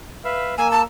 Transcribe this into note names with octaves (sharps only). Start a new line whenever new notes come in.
B4 E5 F5
A#3 G#5 E6
A5